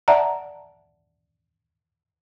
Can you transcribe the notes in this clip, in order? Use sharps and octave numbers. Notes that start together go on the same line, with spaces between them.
D5 E5 F#5 A5 A#5